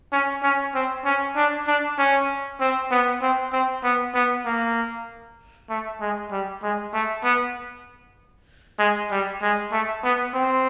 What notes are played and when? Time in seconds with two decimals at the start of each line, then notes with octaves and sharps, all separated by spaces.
0.12 C#4
0.43 C#4
0.75 C4
1.05 C#4
1.36 D4
1.67 D4
1.98 C#4
2.61 C4
2.92 B3
3.22 C4
3.53 C4
3.84 B3
4.14 B3
4.45 A#3
5.69 A3
6.01 G#3
6.31 G3
6.63 G#3
6.93 A3
7.24 B3
8.79 G#3
9.11 G3
9.42 G#3
9.72 A3
10.04 B3
10.34 C4